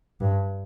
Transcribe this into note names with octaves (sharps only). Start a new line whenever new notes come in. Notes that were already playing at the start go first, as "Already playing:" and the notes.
G2